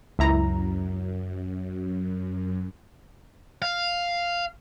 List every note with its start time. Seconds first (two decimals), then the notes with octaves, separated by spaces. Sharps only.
0.19 C#2 F#2 E4 A#5
3.62 F5